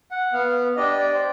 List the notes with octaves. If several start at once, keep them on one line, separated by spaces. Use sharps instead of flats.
F#5
B3 F5
D4 G4 D#5
D5
C5